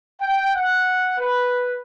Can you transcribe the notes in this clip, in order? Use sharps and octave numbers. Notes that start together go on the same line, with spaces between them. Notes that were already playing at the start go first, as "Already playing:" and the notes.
G5
F#5
B4